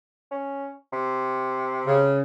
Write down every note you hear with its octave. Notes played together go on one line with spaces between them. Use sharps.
C#4
C3
C#3